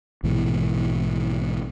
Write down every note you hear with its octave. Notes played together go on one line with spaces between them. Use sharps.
A#1 G#2 B2 E3